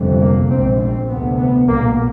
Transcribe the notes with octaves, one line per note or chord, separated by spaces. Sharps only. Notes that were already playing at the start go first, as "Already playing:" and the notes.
Already playing: G1 F2 C3
A#3
A#1 G#2 C4
C4
D2 C3 B3
B3
B1 A#2 A#3